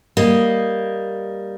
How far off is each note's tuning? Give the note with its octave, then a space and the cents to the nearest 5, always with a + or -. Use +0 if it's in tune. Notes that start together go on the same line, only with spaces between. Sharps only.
G3 +0 A#3 +0 D#5 +0